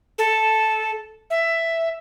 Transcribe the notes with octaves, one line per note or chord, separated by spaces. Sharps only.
A4
E5